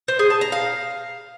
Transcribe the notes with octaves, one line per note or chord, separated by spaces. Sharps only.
C5
G#4
A5
A#5
F5